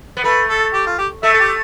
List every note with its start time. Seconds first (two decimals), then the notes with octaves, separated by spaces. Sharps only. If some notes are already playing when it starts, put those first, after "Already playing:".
0.17 B3
0.24 A3 B4
0.49 A4
0.73 G4
0.86 F4
0.98 G4
1.23 A3 E5
1.34 A4
1.40 G4